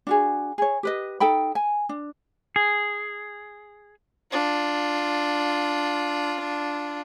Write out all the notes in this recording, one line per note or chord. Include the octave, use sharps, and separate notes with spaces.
D4 F#4 G#4
G#4 C#5
G4 B4 D#5
D#4 A4 G5 B5
G#5
D4
G#4
D4 F4